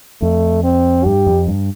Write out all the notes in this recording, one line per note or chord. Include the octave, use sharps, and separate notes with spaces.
F2 A3
C4
G2 G4
F2
G2